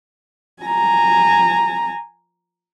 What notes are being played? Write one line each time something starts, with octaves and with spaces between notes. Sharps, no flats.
G#5 A#5